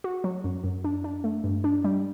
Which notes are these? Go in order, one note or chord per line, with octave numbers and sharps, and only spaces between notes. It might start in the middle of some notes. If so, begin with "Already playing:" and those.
F#4
F#3
F#2
F#2
D4
D4
A3
G2
D4
G3